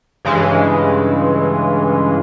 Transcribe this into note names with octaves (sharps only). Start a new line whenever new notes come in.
G2 C#3 E3 G#3